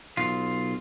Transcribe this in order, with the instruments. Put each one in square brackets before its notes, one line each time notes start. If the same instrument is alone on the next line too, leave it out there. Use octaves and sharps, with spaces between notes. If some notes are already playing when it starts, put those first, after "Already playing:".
[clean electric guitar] B1 F4